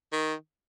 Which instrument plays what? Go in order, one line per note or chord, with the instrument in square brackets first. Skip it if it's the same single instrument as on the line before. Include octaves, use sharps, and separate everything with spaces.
[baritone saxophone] D#3